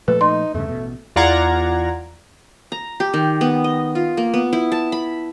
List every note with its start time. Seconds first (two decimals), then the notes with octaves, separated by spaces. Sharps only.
0.08 A#2 F3 A3 A4 B4
0.21 D#4 C6
0.54 E2 G2 C#3 A3
0.69 A1 B2
1.16 E2 F4 D5 F#5 A#5 G#6
2.72 A#5
3.00 G4
3.14 D#3
3.41 B3
3.64 D#5
3.95 F4
4.17 A#3
4.34 B3
4.53 E4
4.72 A5
4.92 B5